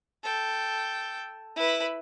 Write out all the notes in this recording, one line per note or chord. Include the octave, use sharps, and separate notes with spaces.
A4 G5
E4 B4